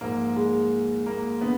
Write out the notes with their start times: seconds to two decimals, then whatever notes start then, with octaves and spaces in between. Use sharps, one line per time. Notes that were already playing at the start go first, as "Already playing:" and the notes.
0.01 G#2 F3 A#3
0.36 G#3
1.06 A#3
1.41 D3 B3